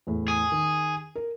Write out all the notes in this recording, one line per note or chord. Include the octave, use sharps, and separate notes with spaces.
E2 A2
G#4
D#3
A#4